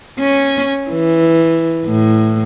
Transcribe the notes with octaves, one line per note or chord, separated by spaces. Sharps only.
C#4
E3
A2